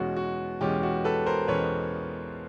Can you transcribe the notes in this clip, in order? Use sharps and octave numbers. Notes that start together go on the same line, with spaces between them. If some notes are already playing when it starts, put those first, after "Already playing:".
Already playing: E2 B2 G#3 C#4 F#4
F#4
E2 B2 G#3 C#4 G4
F#4
A4 B4
A#4 C5
E2 B2 G#3 C#4 B4 C#5